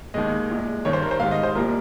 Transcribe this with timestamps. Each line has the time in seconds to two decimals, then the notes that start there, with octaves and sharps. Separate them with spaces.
0.14 D#2 D#3 G#3 D#5
0.50 C2 A#2 G#3
0.85 G2 D#3 G3 C#5
0.93 C5
1.03 A#4
1.11 C5
1.20 G#2 D#3 G3 F5
1.31 D#5
1.43 C5
1.55 C2 A#2 G3 A#4